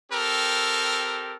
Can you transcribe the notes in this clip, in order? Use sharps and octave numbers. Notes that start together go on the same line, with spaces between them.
C4 G4 A4 A#4